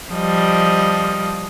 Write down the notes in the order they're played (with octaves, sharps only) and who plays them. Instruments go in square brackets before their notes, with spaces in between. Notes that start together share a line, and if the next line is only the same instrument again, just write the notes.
[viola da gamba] F3 G3 D#5